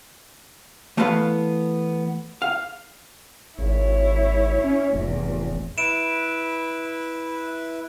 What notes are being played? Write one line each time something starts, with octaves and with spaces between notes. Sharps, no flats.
E3 A3 B3 B4 F5 B5
F5
G#1 E4 C#5
C#4
F1 E2 A2
E4 B4 E5 D7 E7